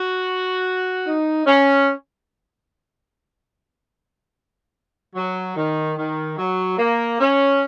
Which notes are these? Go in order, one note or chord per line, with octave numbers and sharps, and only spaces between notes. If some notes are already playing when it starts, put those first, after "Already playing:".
Already playing: F#4
D#4
C#4
F#3
D#3
D#3
F#3
A#3
C#4